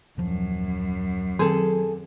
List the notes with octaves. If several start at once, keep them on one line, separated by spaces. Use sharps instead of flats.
D#1 F#2 F3
D#3 F#3 C4 G#4 A4